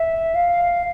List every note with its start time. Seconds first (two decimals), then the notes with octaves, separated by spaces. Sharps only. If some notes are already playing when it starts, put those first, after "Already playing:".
Already playing: E5
0.35 F5